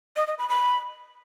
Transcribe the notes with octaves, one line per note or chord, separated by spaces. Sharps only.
D#5
D#5
B5
B5